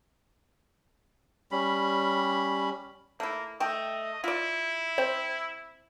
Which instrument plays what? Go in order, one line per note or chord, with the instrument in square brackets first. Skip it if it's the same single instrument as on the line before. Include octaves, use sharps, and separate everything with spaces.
[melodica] G3 C#4 B5
[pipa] A3 E4 [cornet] A#3
[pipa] A3 G5 [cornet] D#5
[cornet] E4 [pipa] F4 D5
[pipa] C4 [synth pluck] C5